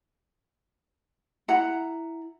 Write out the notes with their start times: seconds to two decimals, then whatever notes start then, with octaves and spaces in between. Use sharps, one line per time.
1.48 E4 F#5 A#5